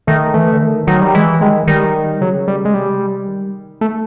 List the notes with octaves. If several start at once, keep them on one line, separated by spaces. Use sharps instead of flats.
D#3 A3
E3 A3
D3
D#3
D#3 F#3
G3
E3 G#3
D#3 G#3
D#3 G3
C#3 F#3
G3
G#3
C3 G3
D#3
A3